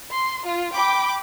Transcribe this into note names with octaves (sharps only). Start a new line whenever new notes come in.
C6
F4
G5 B5 D6